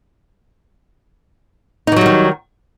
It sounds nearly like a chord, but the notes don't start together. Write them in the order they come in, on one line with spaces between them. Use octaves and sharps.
D#4 E3 F#3 G3 D#3